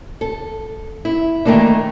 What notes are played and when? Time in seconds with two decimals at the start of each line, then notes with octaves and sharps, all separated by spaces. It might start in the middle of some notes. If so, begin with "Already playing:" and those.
0.21 A4
1.05 E4
1.45 D#3 E3 A3 A#3 D4